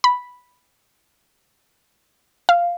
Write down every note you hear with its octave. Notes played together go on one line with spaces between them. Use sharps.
B5
F5